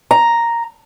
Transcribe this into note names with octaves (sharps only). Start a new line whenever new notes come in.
A#5